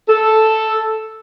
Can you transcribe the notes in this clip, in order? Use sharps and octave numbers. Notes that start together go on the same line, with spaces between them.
A4